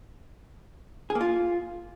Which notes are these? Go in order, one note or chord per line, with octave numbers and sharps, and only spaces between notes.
G#4
A#3
F4